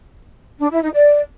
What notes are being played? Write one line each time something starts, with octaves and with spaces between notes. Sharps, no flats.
D4
E4
D#4
D5